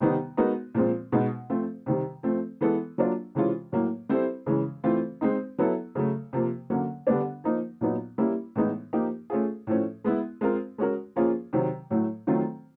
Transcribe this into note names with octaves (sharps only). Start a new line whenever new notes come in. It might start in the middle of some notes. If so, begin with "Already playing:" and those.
C3 D#3 G3 B3 D#4
G#3 B3 D#4 F#4 A#4
A#2 F3 G#3 C4
B2 G#3 B3 D#4
F3 A3 C4 F4
C3 D#3 G3
F3 A3 C4
E3 G#3 B3 E4 A4
F#3 A#3 D4 F4
C3 E3 G#3 C#4 F4
A2 F#3 A#3
G3 C4 E4 A4 C5
C#3 E3 G#3 C#4
E3 A3 C4 F4
G#3 C4 D#4
F#3 B3 E4 A4
C#3 F#3 A3
C3 F3 A#3
D3 F#3 A#3 C#4
D3 G3 B3 D4
F3 A#3 D#4
A#2 F#3 B3 D#4
G3 A#3 C#4 E4
A2 E3 G#3 B3 D#4
F3 A#3 D#4 G4
A3 C#4 F4 G#4
A2 F3 A3 C#4
G#3 B3 E4
G#3 C4 F4 A#4
G#3 C#4 F#4 A#4
F3 A#3 C#4 F4 G#4
C3 D#3 F#3
A2 F#3 A3
D#3 F#3 A3 C4 F4